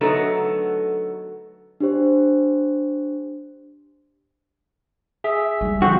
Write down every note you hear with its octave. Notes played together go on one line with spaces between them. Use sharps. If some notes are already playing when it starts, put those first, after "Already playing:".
D3 F#3 A3 B3 D#4 A4
D4 G4 C5
G#4 E5
F#2 G3
D3 F3 C4 F#4